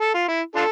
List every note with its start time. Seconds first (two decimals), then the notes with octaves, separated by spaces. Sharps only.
0.01 A4
0.14 F4
0.28 E4
0.56 D4 F4 A4